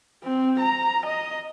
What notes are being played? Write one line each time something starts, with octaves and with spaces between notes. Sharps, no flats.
C4
A#5
D#5